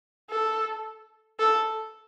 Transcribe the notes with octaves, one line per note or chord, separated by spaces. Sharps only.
A4
A4